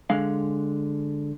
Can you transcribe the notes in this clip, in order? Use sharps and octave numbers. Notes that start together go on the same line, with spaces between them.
D3 G#3 F5